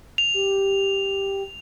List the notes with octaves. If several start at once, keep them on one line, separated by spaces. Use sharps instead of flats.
F7
G4